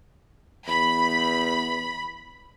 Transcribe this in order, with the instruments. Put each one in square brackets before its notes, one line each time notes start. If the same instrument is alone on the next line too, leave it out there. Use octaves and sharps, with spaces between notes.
[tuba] E2 [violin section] B5